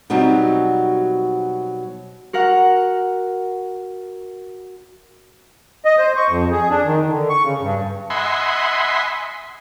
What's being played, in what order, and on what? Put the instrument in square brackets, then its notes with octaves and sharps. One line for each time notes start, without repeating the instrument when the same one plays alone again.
[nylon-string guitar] B2 F#3 G3 C4 D#4
[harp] F#4 A#4 F#5
[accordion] D#5
C5
C#6
F2
G#4
D4
D#3
D3
C#6
C#3
G2
[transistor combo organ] D#5 E5 F#5 G#5 B5 C6